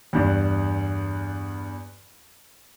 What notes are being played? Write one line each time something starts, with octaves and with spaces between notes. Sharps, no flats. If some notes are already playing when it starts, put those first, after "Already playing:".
E2 G2